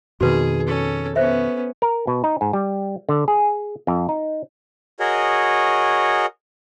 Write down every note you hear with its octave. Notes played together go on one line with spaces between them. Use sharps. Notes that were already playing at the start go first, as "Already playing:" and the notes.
F2 B2 D#3 F#4 G#4 B4
C#4 A4
B3 C#4 C5 E5
A#4
B2
D#4
G#2
G3
D3
G#4
F2
D#4
F#4 G#4 A#4 C#5 D#5